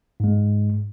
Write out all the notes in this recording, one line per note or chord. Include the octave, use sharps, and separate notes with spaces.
G#2 G#3